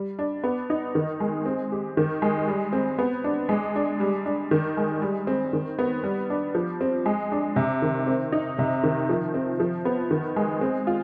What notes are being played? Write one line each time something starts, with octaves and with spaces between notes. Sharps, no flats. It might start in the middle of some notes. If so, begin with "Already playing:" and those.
Already playing: G3
D4
B3
D#4
D#3
G#3
C4
G4
D#3
G#3
G3
C4
B3
D4
G#3
D4
G3
D4
D#3
G#3
G3
C4
D#3
B3
G3
D4
F3
C4
G#3
D4
C3
D#3
C4
D#4
C3
D#3
F3
C4
F3
B3
D#3
G#3
C4
F4